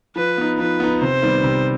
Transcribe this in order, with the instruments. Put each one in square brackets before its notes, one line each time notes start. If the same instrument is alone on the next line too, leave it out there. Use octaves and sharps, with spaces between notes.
[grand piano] F3 [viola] B4
[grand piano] B3 D#4
[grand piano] F3 [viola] B4
[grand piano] B3 D#4
[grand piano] C3 [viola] C5
[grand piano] D#3 G3 B3
C3